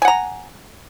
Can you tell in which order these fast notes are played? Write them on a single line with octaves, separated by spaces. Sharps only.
G#5 F#5 A#5